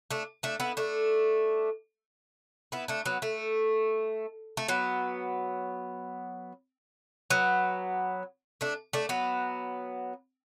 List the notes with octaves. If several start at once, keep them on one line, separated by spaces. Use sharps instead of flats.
A3 D4
A3 D4
B3 E4
A3 D4
B3 E4
A3 D4
F#3 B3
A3
A3
F#3 B3
F#3 B3
A3 D4
A3 D4
F#3 B3